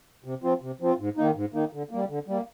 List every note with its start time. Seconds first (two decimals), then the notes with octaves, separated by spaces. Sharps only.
0.24 C3
0.43 F3 C4 F4
0.62 C3
0.80 F3 C4 F4
0.99 G#2
1.17 D#3 A#3 D#4
1.35 G#2
1.54 D#3 A#3 D#4
1.73 D3
1.91 G3 A#3
2.09 D3
2.28 G3 A#3